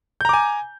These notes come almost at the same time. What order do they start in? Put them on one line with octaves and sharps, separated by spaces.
G6 A#5 D6 G#5